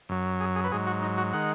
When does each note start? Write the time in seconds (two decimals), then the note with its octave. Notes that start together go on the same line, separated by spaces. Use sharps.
0.09 F#2 F#3
0.40 G#4
0.56 G#4
0.64 B4
0.71 G#2 F#3 G#4
0.87 F#4
1.02 D#4
1.18 F#4
1.33 D#3 G#3 F#5